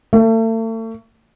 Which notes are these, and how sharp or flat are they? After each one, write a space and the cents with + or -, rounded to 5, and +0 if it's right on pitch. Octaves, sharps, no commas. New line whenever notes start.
A3 +40